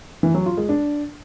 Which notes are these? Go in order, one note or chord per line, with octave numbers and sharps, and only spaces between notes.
E3
F#3
F4
G#3
D4